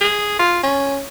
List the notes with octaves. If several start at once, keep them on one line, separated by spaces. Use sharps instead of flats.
G#4
F4
C#4